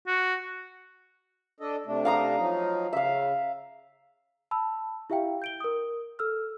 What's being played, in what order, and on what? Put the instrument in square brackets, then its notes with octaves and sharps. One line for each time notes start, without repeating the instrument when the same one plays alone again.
[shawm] F#4
[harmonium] D4 A4 D#5
C3 A3 D4
[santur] F5 A#5 D#6
[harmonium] F3 F#3 D#4
[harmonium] C#3 [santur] E5 F5
[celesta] A5 B5 E6
E4 G4 E5 F5 G5
G6 D7 G7
A#4 D#6
A4 E6 F6